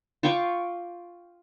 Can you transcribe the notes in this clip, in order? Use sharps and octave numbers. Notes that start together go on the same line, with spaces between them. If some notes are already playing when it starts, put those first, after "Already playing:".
F4 G5 C#6 D6